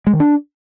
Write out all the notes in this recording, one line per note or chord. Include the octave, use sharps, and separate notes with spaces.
G#3
D#3
D4